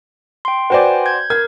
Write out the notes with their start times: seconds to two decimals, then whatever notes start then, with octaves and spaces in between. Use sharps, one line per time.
0.45 G5 C6
0.70 F#4 B4 C5 D5 G5 G#5
1.06 G6 G#6
1.30 A#4 G#6